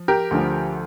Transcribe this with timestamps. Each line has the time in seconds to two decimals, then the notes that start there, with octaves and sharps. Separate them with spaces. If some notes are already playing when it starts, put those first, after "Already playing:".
Already playing: F3
0.08 G4 A#4
0.31 D2 D3 F3